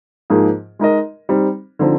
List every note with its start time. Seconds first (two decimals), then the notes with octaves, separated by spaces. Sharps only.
0.30 G#2 F3 A#3 D#4 G#4
0.79 G#3 D#4 A#4 D#5
1.29 G3 C4 D#4
1.79 D3 F3 C4 D#4